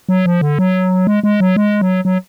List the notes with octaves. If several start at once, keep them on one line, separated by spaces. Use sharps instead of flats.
F#3
F3
D3
F#3
G#3
G#3
F#3
G#3
F#3
F#3